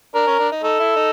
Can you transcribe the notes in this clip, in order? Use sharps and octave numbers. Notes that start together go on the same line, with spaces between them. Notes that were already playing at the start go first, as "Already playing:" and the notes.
D4 A#4
C#4
D4
D#4
D#4 A4
E4
D#4